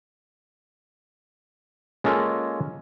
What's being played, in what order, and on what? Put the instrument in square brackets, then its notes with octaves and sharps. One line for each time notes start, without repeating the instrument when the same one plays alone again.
[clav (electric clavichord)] G#3 A#3 C#4 F4 A4